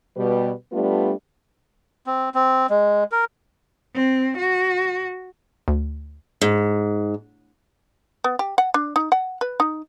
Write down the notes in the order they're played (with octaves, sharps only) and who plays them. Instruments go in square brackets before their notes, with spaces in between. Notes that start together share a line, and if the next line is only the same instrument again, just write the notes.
[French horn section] B2 G3 B4
G3 A3 B3 D4 F4 G4
[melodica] C4
C4
G#3
A#4
[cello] C4
F#4
[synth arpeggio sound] D2
[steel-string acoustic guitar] G#2
[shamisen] B3
G4
F#5
D4
D#4
F#5
B4
D#4